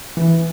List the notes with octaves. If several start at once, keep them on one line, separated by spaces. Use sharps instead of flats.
E3